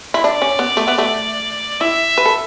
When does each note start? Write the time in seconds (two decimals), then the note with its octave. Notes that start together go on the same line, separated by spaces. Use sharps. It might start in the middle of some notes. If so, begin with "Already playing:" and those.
0.14 E4
0.24 D4 D5
0.42 C#4
0.59 B3
0.77 A3
0.88 B3
0.98 A3
1.81 E4 E5
2.18 B4
2.26 A4